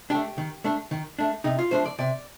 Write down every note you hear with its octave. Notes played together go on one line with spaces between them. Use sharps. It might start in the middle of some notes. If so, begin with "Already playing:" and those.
A3 D4 G4
D#3
A3 D4
D#3
A3 D4
C3 D#4
F4
F3 A3 D4 C5
D5
C3 D5